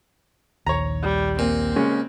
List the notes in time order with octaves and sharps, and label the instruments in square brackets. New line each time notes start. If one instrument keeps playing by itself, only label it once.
[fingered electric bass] A#1 D#2 [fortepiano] C#5 A#5
[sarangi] G3
[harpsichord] A#2 [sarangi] C4
[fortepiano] C#3 G#3 C#4